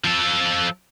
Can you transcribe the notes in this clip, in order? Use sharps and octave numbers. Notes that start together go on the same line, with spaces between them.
F3 A4